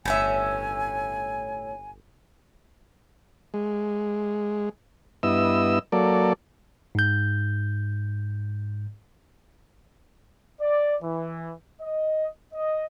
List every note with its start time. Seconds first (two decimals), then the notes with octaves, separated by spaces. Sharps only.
0.05 G1 A2 C#4 E5 G#5
3.54 G#3
5.23 G2 B3 E4 D#5 E6
5.92 F#3 A#3 A4 D5
6.95 G#2 G6
10.61 D5
11.01 E3
11.81 D#5
12.54 D#5